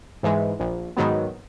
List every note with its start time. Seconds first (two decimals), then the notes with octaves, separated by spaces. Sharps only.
0.23 G#2 E3 G#3
0.60 A#1
0.97 G#2 D#3 F#3 B3